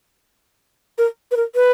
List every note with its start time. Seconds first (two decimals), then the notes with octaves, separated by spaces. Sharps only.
0.98 A#4
1.31 B4
1.37 A#4
1.55 B4